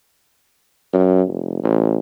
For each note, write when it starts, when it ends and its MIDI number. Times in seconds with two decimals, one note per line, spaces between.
0.93 1.23 42
1.28 1.61 29
1.63 1.99 33